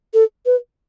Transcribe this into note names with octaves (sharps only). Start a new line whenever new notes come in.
A4
B4